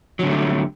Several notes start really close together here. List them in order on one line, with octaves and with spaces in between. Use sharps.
F#3 D3 A3 G3